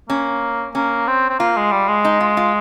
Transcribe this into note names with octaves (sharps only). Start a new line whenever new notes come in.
A#3 C#4
A#3 C#4
C4
C4
A#3 F4
G#3
G3
G#3
D#4
F4
F4